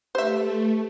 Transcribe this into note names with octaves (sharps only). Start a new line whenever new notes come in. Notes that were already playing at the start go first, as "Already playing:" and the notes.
A3 G4 B4 C5 E5